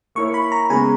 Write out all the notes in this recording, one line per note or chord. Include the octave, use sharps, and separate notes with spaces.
A#3 E4 A#4 C#5 C#6
B5
A#5
C#3 G#3 B3 G#5